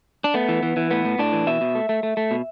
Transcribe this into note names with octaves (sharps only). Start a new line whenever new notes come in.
D4
A3 B3
E3
E3
E3
A2 B3
A2
A2 D4
E3
B2 E5
B2
A3
A3
A3
A3
B2